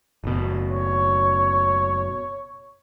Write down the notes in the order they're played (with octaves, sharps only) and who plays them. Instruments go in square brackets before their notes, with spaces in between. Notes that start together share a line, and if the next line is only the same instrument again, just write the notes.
[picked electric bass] F#1 B2
[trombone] C#5